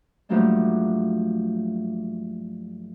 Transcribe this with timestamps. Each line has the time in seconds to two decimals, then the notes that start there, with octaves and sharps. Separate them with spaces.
0.29 G2 F3 F#3 A3 A#3 D4